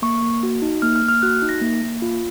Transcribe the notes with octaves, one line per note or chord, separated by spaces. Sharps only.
A#3 C#6
A#3
F#4
D#4
A#3 F6
F6
A#3
F6
F#4 F#6
D#4
A#6
A#3
A#3
F4